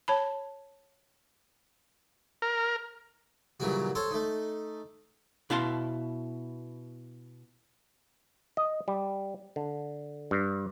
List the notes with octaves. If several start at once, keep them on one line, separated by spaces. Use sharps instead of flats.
C#5 A5 B5
A#4
G2 A#2 C#3 E3 F#3 F#4
A4 C5 C#5
A3 D#4
B2 E4 F5 A5 C6
D#5
G3
D3
G2